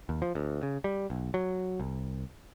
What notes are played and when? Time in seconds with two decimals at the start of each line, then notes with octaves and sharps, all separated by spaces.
0.09 D#2
0.22 F3
0.35 D2
0.63 C#3
0.84 G3
1.10 B1
1.34 F#3
1.80 C2